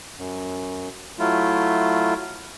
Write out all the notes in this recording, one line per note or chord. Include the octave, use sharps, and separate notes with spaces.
F#2
F#3 A3 E4 F4